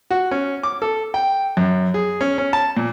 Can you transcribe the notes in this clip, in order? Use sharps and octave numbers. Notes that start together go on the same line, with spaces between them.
F#4
C#4
D6
A4
G5
F#2
G#4
C#4
C#4
A5
A#2